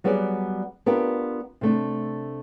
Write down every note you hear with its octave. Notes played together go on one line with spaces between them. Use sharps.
F#3 G3 B3 F#4 G#4 D5
B3 D4 F4 G4 A#4
C3 A3 D4